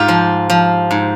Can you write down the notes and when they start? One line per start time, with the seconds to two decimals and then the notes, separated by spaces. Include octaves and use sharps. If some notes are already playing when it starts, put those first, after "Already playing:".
Already playing: G#2 F4 G4
0.08 F3
0.50 F3
0.91 G#2